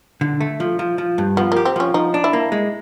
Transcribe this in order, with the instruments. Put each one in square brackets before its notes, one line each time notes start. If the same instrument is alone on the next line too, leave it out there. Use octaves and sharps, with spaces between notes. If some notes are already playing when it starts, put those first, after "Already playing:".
[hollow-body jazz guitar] D3
A3
F3
F3
F3
G2
[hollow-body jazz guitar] F3 [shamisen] B3
[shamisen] A#3 [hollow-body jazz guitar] G4
[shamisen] C4
[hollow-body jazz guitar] F3 [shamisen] C#4
[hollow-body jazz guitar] F3 [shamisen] D#4
[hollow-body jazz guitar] D4
[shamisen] E4
[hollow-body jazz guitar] A#3
G#3